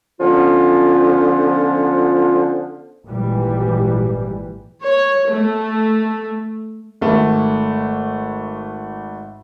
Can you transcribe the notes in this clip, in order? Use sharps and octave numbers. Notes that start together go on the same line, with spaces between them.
D3 F3 B3 C#4 F4
G#1 A#2 E3 G3
C#5
A3
G#1 A3